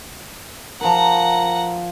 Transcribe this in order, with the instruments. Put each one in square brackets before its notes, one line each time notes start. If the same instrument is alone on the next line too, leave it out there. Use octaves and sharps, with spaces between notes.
[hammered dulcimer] F3 A#4 [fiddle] F#5 A#5